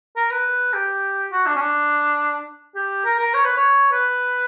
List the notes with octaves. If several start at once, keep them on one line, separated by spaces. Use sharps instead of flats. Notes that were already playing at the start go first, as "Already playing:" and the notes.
A#4
B4
G4
F#4
D4
C#4
D4
G4
A#4
A#4
C#5
B4
C#5
B4